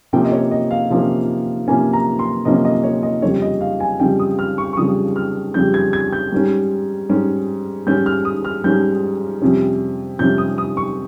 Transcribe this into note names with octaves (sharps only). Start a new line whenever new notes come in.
C3 F3 A#3 C#4 G5
D#5
C#5
D#5
F5
C3 F3 A#3 C#4
C3 F3 A#3 C#4 G#5
A#5
C6
C3 F3 A#3 C#4 D#5
D#5
C#5
D#5
F2 C#3 G3 C#5
D#5
F5
G#5
F2 C#3 G3 G5
D#6
F6
C#6
C#6
F2 C#3 G3 D#6
F6
F2 C#3 G3 G6
G#6
G#6
G6
G#2 G3 C#4
G#2 G3 C#4
G#2 G3 C#4 G6
F6
D#6
F6
G#2 G3 C#4 G6
F2 C3 G3 C#4
F2 C3 G3 C#4 G6
D#6
D#6
C#6